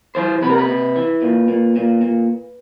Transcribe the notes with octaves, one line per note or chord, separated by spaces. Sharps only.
E3 C5
C3 B4
A#4
B4
C3
E3
A#2
A#2
A#2
A#2